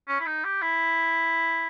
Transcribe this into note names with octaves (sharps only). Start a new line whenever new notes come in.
C#4
E4
D#4
G4
E4